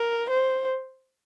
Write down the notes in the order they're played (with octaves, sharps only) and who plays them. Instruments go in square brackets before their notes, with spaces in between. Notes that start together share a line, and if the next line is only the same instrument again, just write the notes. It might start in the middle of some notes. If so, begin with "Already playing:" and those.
Already playing: [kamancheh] A#4
C5